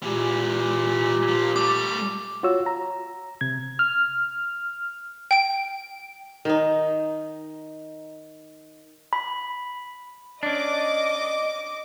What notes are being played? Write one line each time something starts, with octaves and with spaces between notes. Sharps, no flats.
A#2 E3 G#3 G4
F3 A#3
G3 A3 D6
F4 F#4 C#5 E6
A#5
C3 G#6
F6
G5 D7
D#3 D#4
B5
C#4 D4 D#5 D6